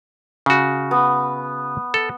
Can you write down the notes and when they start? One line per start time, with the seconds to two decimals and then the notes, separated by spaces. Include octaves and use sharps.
0.46 C#3 F#4
0.91 B3
1.94 A4